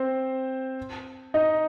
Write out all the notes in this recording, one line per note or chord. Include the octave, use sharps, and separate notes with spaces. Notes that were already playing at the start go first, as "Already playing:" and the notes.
Already playing: C4 C5
D#4 D#5